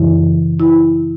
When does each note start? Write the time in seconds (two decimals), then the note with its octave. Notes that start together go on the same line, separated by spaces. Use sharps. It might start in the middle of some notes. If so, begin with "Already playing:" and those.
Already playing: F#2 C#3 E3 E4
0.60 E4